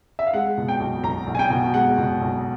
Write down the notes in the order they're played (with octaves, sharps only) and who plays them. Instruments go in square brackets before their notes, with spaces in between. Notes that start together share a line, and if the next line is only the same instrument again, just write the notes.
[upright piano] E5
F5
G#3 F#5
B2
G5
B1
B1 A#5
B1
G#5
G5
B2
G#3 F#5
B2
B1